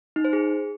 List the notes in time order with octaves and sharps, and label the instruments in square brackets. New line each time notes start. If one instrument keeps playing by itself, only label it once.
[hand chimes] D#4
C5
G#4